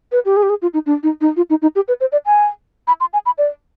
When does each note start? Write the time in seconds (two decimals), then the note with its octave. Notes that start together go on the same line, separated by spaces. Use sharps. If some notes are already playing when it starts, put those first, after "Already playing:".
0.12 B4
0.25 G4
0.36 G#4
0.43 G4
0.49 G#4
0.62 F4
0.74 D#4
0.86 D4
1.03 D#4
1.21 D#4
1.37 F4
1.50 D#4
1.62 D#4
1.75 G4
1.88 B4
2.00 C5
2.12 D5
2.26 G#5
2.87 B5
3.00 C6
3.13 G#5
3.26 B5
3.38 D5